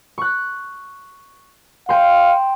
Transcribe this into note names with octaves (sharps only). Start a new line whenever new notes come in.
C#6 F#6
F5 G5 C6